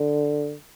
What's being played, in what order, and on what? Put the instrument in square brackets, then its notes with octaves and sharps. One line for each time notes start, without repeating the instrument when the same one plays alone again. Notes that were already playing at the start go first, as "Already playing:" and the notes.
Already playing: [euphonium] D3